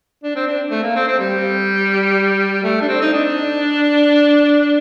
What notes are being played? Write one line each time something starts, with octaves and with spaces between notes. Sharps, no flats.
D4
C4
D4
A3
A#3
C4
C4
G3
A3
D4
C4
D#4
D4